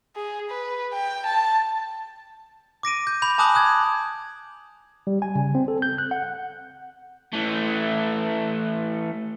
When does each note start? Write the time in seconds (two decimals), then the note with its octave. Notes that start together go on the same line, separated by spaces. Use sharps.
0.16 G#4
0.50 B4
0.94 G5
1.26 A5
2.83 D6 A#6 D7 D#7
3.07 G6
3.22 B5 G6 F7
3.38 G#5 A5 D6 D#6 F#6 F#7
3.55 D#6 F#6 G#6
5.07 G3
5.22 G#5
5.35 C#3
5.55 C4
5.68 A4
5.82 G6
5.98 F#6
6.11 F#5
7.33 E3 A3